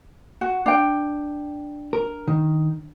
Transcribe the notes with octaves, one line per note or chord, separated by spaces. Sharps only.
F#4
D4 G5
A#4
D#3